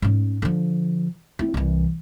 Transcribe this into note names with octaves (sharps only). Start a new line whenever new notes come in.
G#2 C#4
D3 F3
C4 E4
C2 E3